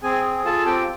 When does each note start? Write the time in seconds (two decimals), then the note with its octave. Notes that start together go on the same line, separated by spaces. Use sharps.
0.03 C4 G#4 G#5
0.24 G#4
0.45 F4 A4 A5
0.66 C4 G4 G5